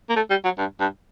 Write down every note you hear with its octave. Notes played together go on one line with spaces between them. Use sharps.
A#3
A3
G3
F#3
G2
G2